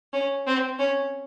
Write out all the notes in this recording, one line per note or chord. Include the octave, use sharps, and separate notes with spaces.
C#4
C4
C#4